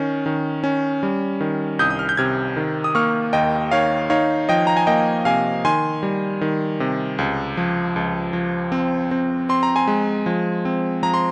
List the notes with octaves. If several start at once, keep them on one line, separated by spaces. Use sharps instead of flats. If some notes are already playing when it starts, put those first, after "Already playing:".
Already playing: D#3 C#4
D#3
C#4
G3
D#3
C2 D#6 G6
D#6
F6
G6
C3 F6 G#6
D#3
D#6
A#3 C#6 F6
D#2 D#5 G5
D#3 C#5 F5
D#4 C#5 F5
F3 D#5 G5
A#5
G#5
A#3 D#5 G5
C3 F5 G#5
D#3 G#5 C6
G3
D#3
C3
C#2
F3
C#2
F3
C4
C4
C4 C6
A#5
G#5 C6
G#3
F3
C4
F3 A#5
C6